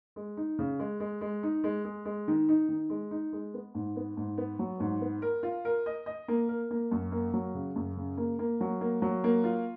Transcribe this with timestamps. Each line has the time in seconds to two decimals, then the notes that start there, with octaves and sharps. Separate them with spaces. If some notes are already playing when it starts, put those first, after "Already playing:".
0.16 G#3
0.37 D#4
0.59 C#3
0.79 G#3
1.00 G#3
1.21 G#3
1.43 D#4
1.64 G#3
1.85 G#3
2.05 G#3
2.28 D#3
2.49 D#4
2.69 D#3
2.90 G#3
3.11 D#4
3.33 G#3
3.54 B3
3.74 G#2
3.96 B3
4.17 G#2
4.38 B3
4.59 F#3
4.80 G#2
5.01 B3
5.22 A#4
5.43 F4
5.65 A#4
5.86 D#5
6.06 D#5
6.28 A#3
6.49 A#4
6.71 A#3
6.91 F#2
7.12 A#3
7.33 F#3
7.55 C#3
7.76 F#2
7.97 C#3
8.17 A#3
8.39 A#3
8.61 F#3
8.81 A#3
9.02 F#3
9.24 A#3
9.44 F4